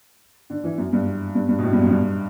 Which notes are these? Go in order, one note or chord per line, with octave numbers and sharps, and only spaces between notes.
D3
E3
F#2
G2
G2
G2
B2
A2
G2
F#2
G2